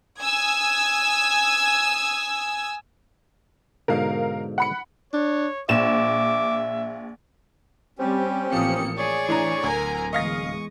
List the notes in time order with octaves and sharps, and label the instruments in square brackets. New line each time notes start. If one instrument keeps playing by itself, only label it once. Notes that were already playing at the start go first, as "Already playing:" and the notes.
[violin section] G#5 D#6 E6 G#6
[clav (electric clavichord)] G#2 B2 D3 [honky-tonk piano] A#4 F5
[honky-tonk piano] F#5 B5 C#7
[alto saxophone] D4 [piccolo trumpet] C#5
[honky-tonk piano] A#1 E7 [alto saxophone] E5 [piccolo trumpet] D6
[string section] G3 [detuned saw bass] C4 [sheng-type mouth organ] C#4 G4
[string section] A1 A#3 C#7 [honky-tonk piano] F3 D#6
[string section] G#4 [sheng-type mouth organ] C#5 D5 C#6
[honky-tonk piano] A2 D4 A#5 [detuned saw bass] E3
[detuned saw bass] D1 [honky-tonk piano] D2 [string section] A#4 G#5 A#5
[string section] E2 G#3 D#6 [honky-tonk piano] D#5 F5 A#6 [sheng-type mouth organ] C#6